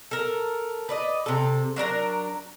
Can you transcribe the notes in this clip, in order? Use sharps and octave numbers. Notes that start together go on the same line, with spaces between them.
A4 A#4
B4 D5 D#5
C3 A4
F#3 D4 A#4 A#5